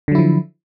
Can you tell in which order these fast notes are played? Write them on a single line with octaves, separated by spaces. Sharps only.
D3 F#3 E4 F3